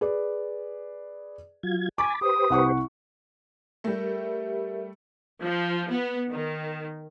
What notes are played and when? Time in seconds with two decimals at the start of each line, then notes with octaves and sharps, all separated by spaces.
0.01 G#4 B4 D5
1.63 F#3 F4 G#6
1.98 G#5 A5 B5 D6
2.21 G4 B4 C5 D#6
2.50 C2 F#5 C#6
3.84 G3 A3 G4 A#4 E5
5.42 F3
5.90 B3
6.30 D#3